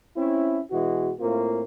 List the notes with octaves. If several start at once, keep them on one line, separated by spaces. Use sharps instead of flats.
C4 C#4 E4
B2 E3 G#3 F#4
A2 A#3 C4 F4